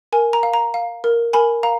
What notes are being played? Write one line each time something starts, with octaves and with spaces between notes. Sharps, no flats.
A#4 G#5
A#5
F5
A#5
F5
A#4
A#4 G#5 B5
F5 A#5